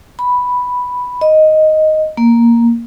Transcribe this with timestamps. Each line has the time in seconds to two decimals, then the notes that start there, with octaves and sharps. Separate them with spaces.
0.19 B5
1.21 D#5
2.17 A#3